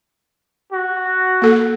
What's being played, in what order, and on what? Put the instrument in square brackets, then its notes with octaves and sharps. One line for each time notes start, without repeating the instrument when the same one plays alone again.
[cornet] F#4
[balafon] A#3 A4